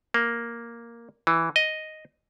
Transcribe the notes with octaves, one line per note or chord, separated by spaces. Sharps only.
A#3
E3
D#5